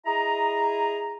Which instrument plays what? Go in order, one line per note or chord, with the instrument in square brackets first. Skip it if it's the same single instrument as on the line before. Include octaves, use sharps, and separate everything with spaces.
[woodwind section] E4 G#4 D#5 A#5